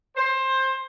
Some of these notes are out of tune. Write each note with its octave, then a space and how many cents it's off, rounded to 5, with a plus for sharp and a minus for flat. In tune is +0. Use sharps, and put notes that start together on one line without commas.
C5 +20